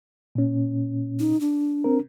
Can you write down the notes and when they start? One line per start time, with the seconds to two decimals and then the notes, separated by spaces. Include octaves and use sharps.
0.35 A#2 C#4
1.19 D#4
1.41 D4
1.84 C4 A#4